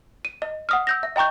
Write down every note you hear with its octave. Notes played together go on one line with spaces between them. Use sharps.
D#7
D#5
F#5 D#6 F6
E6 G6 A#6
E5
D#5 G5 A#5 C#6 G6